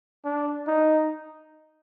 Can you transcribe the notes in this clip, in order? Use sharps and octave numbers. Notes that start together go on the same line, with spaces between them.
D4
D#4